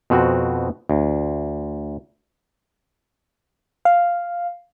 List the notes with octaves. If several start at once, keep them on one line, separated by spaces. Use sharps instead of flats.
F2 B2 C4 F#4
D2
F5